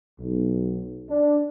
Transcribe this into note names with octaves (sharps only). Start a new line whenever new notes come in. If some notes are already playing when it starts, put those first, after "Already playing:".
B1
D4